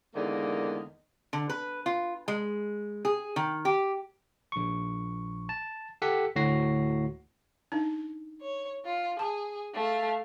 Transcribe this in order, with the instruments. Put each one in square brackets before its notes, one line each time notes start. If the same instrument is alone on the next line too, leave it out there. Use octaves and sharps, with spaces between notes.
[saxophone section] E2 G#2 D3 D#3 A#3
[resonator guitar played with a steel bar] D3
B4
F4
G#3
G#4
D#3
G4
[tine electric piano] A#1 C#6
A5
G4 A4 F#5 B6 C#7
D2 A2 F#4 A#6 C7
[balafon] D4 D#4
[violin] C#5
F4
[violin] G#4 [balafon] A5
[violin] A3 F5